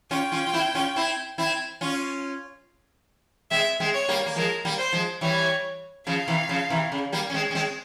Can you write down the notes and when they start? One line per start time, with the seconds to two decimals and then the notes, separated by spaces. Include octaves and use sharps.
0.11 C#4 F4 G5
0.32 C#4 F4
0.47 F4
0.53 C4 E4
0.75 C#4 F4
0.96 C4 E4
1.38 C4 E4
1.81 C#4 F4
3.51 G#3 C4 E5
3.80 G#3 C4
3.94 C#5
4.08 G3 A#3
4.26 A#3
4.36 F3 G#3 A#4
4.65 G3 A#3
4.78 C5
4.93 F3 G#3
5.21 E3 G3 C#5
6.06 C#3 F3 F5
6.28 C3 E3
6.49 C#3 F3
6.70 C3 E3
6.92 C#3
7.12 G3 A#3
7.30 C#4
7.34 G#3 C4
7.51 C#4
7.55 G#3 C4